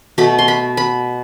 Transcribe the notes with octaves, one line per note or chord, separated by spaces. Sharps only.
B2 A3 B5
C6
B5
B5